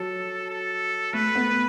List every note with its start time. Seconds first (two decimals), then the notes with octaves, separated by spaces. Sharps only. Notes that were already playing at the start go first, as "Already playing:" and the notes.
Already playing: F#3 A4
0.50 A4
1.13 A3 B4
1.35 B3